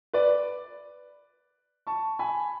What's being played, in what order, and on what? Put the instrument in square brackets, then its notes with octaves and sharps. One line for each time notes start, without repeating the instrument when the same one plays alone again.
[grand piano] B4 D5
A5 C#6
G#5 B5